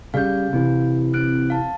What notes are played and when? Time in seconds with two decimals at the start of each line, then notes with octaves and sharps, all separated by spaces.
0.14 C#3 G3 F5 G6
0.53 C3 E3
1.13 C4 F#6 D7
1.50 F5 A5